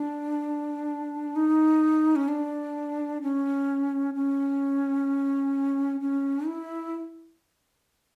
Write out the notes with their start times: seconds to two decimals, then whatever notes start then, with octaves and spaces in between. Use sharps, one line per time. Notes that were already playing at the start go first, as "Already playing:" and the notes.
Already playing: D4
1.36 D#4
2.16 C#4
2.28 D4
3.22 C#4
4.15 C#4
6.01 C#4
6.46 E4